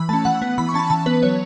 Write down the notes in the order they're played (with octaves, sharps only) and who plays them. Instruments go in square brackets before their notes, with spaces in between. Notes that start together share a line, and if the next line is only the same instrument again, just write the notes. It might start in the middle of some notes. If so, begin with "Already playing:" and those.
Already playing: [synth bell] E3 B5
A3 C#4 A5
E3 F#5
B3
E3 B5
C#6
C#4 A5
B5
E3 A5
B3 B4
F#3 C#5